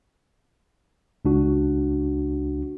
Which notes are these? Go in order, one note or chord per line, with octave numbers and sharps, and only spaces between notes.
C#2 D4 F#4